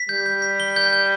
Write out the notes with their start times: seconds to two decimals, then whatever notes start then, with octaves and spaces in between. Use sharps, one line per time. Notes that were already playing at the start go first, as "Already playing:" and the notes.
Already playing: B6
0.09 G3 G6
0.26 G6
0.42 B6
0.60 G7
0.76 G6
0.93 G6